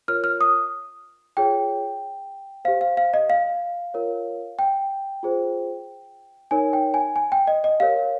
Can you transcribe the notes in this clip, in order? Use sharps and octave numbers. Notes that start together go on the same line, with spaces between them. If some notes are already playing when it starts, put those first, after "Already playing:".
F4 A#4 C#5 F6
F6
D#6
F4 G#4 C#5 G5
G4 C5 F5
F5
F5
D#5
F5
F4 A#4 C#5
G5
F4 G#4 C5
D#4 A#4 C#5 G#5
G5
G#5
G#5
G5
D#5
D#5
G4 A#4 C#5 F5